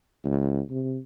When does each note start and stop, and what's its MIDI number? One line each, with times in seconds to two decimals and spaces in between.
0.25 0.61 37
0.70 0.98 48